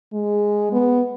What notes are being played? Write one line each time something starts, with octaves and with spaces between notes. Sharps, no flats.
G#3
B3